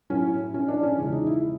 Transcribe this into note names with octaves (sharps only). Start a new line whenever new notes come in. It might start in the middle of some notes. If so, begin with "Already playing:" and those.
A2 F#3 C#4
C#4
D4
C#4
E2 C#3 F3 G#3
D#4
E4